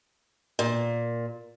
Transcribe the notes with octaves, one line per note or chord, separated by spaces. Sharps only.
A#2